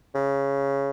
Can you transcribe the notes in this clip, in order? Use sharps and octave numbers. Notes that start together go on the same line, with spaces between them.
C#3